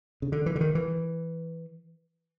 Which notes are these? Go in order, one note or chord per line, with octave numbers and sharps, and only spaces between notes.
C#3
D3
E3
D3
D#3
E3